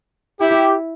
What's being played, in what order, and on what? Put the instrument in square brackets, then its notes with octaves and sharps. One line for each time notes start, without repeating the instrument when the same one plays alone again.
[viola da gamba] E4 [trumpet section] G4